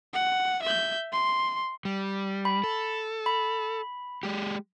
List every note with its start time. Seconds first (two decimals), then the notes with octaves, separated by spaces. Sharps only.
0.13 F#5
0.62 E5 G6
1.13 C6
1.85 G3
2.45 B5
2.64 A4
3.26 B5
4.23 G#3 G4